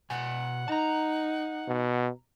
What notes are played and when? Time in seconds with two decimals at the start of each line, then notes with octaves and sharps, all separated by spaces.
0.10 B2 F#5 G#5
0.68 D#4 A5 A#5
1.68 B2